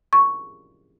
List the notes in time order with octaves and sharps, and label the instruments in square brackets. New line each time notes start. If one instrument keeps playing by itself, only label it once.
[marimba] C#6